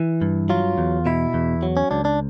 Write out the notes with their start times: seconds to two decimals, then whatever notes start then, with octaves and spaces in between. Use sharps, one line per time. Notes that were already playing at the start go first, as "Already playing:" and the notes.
Already playing: E3
0.22 G2
0.49 F#3 F4
0.78 E2
1.06 B2 E4
1.34 E2
1.63 F#3
1.77 C#4
1.91 C#2 D4
2.05 D4